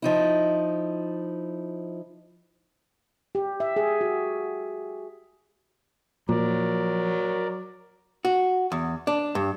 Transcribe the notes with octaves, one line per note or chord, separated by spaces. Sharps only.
F3 D#4 E4
G4
E5
G#4
F#4
A#2 F3 F#3 A#4 D5
F#4
E2
D4
G2